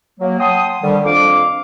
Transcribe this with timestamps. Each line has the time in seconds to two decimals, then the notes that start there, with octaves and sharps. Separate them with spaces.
0.20 F#3 A#3
0.39 F#5 G5 A5 C6 D#6
0.82 D3 D#3 F3 G3
1.05 F2 D4 F5 D6